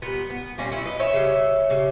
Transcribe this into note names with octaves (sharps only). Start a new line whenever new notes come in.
A#2 G3 B3
B3
A#2 G3 A#3 C#4
C#4 E4
B4 D#5
C#5 E5
C#3 G3
C#3 G3